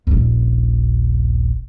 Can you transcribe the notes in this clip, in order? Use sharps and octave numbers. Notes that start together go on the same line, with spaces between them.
D#1 A#1